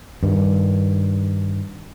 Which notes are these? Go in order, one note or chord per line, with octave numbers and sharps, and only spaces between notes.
G2 D#3